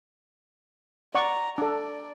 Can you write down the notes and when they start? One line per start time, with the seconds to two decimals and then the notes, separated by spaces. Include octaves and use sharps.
1.15 D5 F#5 A#5 C#6
1.58 D4 A4 D5